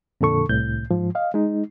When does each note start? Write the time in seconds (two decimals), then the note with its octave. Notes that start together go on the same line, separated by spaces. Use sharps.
0.21 F2 A#2 D3 A4 C#6
0.49 C2 A2 G6
0.91 G#2 F3
1.15 D#5 F5
1.34 G#3 D#4